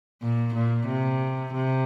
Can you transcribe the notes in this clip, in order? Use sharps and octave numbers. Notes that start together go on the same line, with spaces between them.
A#2
A#2
C3
C3